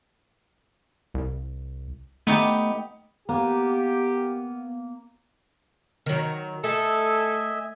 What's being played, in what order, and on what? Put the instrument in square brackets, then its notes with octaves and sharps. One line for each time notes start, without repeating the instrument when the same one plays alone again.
[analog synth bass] C2
[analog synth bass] A3 [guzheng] B3 D#4 G4
[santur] A#3 [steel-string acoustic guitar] B3 [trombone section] G4
[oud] D#3 F#3
[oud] A3 [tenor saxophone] A4 [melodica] D#5 E5 G#5